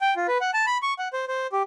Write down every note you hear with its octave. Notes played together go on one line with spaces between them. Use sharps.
G5
F4
B4
F#5
A5
B5
C#6
F#5
C5
C5
G4